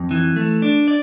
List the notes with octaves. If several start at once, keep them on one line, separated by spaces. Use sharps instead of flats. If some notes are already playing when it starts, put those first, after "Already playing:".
Already playing: F2
E3
A3
D4
D5